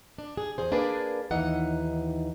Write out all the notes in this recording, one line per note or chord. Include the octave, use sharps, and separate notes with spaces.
D4
G#4
E2 G#4 C5
A#3 D4 G#4 B4 D5
D#2 E3 D#4 F#5